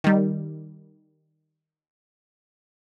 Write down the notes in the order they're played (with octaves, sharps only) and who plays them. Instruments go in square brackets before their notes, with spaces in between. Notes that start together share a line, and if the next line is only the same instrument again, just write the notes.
[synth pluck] D#3 G3